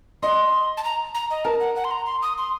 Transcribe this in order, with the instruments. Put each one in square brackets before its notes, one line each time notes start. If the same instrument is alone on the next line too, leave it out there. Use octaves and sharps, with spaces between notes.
[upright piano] D#5 [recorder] C6
[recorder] A5
A#5
A#5
D#5
[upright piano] A#4 [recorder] A5
[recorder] F#5
F#5
C6
A#5
C6
D#6
C6